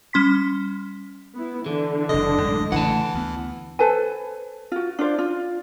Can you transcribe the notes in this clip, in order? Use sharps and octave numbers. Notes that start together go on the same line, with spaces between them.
G3 C#4 C6 B6
B3 E4
D3 E3
F#1 C3 D#5
A1 F#2 G#3
A1 C#3 E3 A3 F#5 A5
D2 B3
A4 B4 C5 G#5
F4 F#4
D4 F4 C5 D5
F4